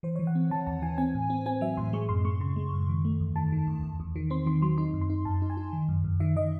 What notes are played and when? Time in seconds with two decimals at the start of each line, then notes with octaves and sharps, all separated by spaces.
0.03 E3 C5
0.16 C#5
0.19 E3
0.27 F#5
0.35 C4
0.51 E3 A5
0.67 D#2 A5
0.82 E3 G#5
0.98 C4 G#5
1.15 A2
1.30 C4
1.46 C4 G#5
1.61 F#3 E5
1.77 A2 C6
1.93 G#3 C#6
2.09 F#2 C6
2.25 G#3 C#6
2.40 C#3 C6
2.56 G#3
2.73 F#2
2.89 D#3
3.05 A3
3.20 E2
3.36 D#3 A5
3.52 D#3
3.67 E2
3.83 E2
4.00 E2
4.16 D#3
4.30 C4 C6
4.46 D#3 C6
4.62 F#3 C6
4.78 D#4 C6
4.94 F#2
5.01 C6
5.10 D#4
5.25 F#2 A5
5.42 D#4
5.50 G#5
5.57 D#4
5.73 D#3
5.89 F#2
6.04 F#2
6.20 D#3 E5
6.36 D#3 D#5